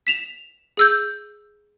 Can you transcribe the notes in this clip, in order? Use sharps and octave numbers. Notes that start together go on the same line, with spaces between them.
B6 E7 F7
G#4 E6 G6